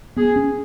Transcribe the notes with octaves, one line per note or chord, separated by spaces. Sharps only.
B3 G#4
C#4